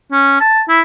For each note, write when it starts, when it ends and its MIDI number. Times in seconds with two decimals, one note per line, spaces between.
0.12 0.40 61
0.40 0.62 81
0.68 0.81 64